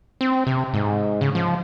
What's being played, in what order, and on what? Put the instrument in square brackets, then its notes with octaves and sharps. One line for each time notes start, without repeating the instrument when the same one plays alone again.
[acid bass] C4
C3
G#2
C#3
F3